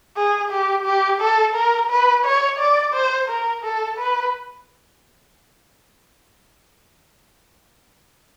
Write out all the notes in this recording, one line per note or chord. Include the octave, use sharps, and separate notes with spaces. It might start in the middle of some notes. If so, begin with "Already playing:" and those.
G#4
G4
G4
A4
A#4
B4
C#5
D5
C5
A#4
A4
B4